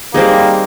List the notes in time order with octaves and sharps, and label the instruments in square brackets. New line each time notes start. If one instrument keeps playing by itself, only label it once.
[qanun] G3 C4 D#4 G#4 [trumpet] A#3